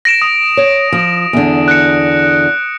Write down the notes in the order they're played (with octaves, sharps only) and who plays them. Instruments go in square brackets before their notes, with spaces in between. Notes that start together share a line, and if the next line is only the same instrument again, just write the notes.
[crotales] A#6 D7 E7
D#6
[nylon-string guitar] C#5
F3
E2 D3
[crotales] F#6 C#7